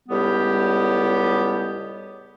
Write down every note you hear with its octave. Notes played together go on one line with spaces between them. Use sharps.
C#2 A2 G3 B3 G4